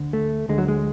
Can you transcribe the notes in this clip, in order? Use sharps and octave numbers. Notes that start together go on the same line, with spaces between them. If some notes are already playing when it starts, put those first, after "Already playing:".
Already playing: D2 D3
A3
D2 D3 G#3
F#3
G#3